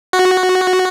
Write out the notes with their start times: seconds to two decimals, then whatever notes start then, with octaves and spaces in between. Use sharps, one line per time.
0.13 F#4